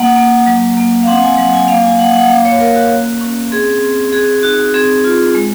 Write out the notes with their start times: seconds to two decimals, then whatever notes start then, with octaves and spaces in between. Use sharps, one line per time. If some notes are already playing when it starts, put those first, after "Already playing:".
Already playing: A#3 F#5
0.16 A#3
0.46 F#3
0.77 A#3
1.03 F5
1.07 C4 F#5
1.23 G#5
1.37 F#3 F#5
1.54 G#5
1.68 A#3 F5
1.84 G#5
1.99 A#3 F#5
2.14 F#5
2.29 A#3 F5
2.45 C#5
2.60 A#3 A#4
2.76 F#4
2.90 C#4
3.21 C#4
3.51 C4 G#4
3.82 C4
4.13 F#4 G#4
4.43 D#4 F#4
4.74 C4 G#4
5.04 F4
5.35 G#3